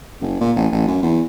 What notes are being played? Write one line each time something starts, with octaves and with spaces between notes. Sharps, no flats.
F#1
A#2
A1
A1
F#2
E2